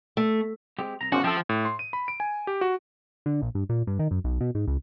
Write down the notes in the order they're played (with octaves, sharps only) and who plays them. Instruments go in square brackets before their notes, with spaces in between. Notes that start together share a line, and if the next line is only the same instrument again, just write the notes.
[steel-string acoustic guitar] A3
[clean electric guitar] G#3 C4 G4
C2 A#5
[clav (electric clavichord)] G#1 C5 [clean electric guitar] E2 C#3 F3 [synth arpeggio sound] C#4 D6 [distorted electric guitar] F#4
[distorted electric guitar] F3 [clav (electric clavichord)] C4 A4 [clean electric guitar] E5 G5
[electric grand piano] A2
C6
D#7
B5
D7
G#5
G4
F#4
[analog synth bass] D3
A#1
G2
A#2
G2
D#3
F#2
B1
B2
G#2
C#2